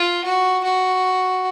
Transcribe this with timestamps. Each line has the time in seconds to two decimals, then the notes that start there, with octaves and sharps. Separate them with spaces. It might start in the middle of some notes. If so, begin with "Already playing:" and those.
Already playing: F4
0.24 F#4
0.64 F#4